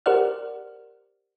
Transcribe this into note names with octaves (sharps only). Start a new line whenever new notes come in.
G4 A#4 C5 D5 F#5 F6